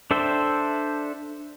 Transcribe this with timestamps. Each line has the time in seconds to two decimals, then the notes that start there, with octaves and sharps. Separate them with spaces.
0.11 D4 A4 C5 E5 G5